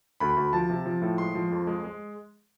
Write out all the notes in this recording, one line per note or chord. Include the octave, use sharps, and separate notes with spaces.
D2 B5
D2
F3 A5
C3
F3
A2
G#3 C6
F3
F2
G#3
G#3